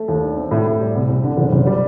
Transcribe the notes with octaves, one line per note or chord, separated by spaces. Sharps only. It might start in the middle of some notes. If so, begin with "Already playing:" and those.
Already playing: A3
D#2
D4
C4
A2
A2
G3
C2
C2
D3
F#1
F#1
G3